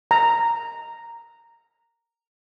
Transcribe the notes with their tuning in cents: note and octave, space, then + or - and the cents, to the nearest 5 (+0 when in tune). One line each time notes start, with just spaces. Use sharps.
A#5 -5